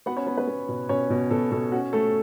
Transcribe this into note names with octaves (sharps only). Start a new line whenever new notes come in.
B3 F#4 F#5
C#4 C#5
B3
B3 B4
B3
B2
B2 C#4 C#5
B2
B2 A4
B2 A4
C#4 F#4
A3 A4